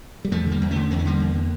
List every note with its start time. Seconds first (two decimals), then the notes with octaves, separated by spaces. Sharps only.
0.25 G3
0.31 E2 F3 A3
0.46 D3
0.52 G3 A#3
0.61 E2
0.71 D3 A3 C#4
0.90 E2 A#3
0.99 C#4
1.05 D3 G3 A#3
1.20 E2
1.35 D3